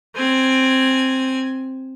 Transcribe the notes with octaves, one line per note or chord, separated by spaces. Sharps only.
C4 G#5